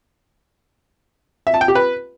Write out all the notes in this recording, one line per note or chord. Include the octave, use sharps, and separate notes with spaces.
E5
A5
G5
G4
B4